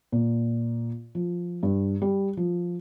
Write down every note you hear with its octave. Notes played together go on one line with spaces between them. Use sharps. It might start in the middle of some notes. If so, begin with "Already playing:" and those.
A#2
F3
G2
G3
F3